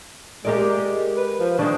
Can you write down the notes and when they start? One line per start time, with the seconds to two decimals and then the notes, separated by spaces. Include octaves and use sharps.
0.45 G#3 G4 A#4 D5
1.17 B4
1.40 F3
1.59 D#3 G#3 D4